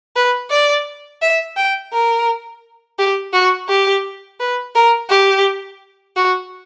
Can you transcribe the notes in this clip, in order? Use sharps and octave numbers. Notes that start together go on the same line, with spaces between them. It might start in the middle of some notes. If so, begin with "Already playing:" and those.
B4
D5
E5
G5
A#4
G4
F#4
G4
B4
A#4
G4
F#4